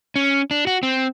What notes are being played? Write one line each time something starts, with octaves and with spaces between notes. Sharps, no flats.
C#4
D4
F#4
C4